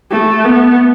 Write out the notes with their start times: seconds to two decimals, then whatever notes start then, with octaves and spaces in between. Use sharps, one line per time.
0.11 A3
0.44 B3